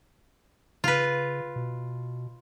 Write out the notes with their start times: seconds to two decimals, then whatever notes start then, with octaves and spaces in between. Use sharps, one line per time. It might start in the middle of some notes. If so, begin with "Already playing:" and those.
0.84 C#3 F4 B4
1.56 B2